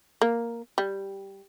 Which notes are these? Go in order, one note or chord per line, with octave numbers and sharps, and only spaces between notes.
A#3
G3